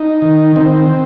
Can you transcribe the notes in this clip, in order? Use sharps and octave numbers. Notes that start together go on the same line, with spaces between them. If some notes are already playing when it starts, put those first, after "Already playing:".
Already playing: D#4
D#3
D#3 C4